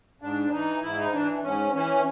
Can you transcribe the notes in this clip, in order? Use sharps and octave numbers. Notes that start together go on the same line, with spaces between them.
G#2 D4
E3 D#4
G#2 E4
D#4
E3 D4
G#2 C#4
E3 C#4